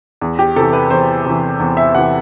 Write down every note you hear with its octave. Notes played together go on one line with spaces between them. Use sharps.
E2
G4
C3 E3 A4
B4
E2 C5
C3 E3
E2
E5
C3 E3 F#5